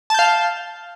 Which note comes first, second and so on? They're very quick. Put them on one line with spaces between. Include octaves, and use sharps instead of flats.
A5 G6 F5